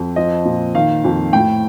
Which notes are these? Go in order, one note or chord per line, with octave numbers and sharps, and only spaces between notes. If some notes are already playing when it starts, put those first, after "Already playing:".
Already playing: F2
F3 D#5
A#2
D#3 F5
F2
A2 G5